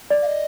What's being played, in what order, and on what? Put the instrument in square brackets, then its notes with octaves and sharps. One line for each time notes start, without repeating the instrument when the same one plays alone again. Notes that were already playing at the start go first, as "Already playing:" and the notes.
[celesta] D5
[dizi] F5
D#5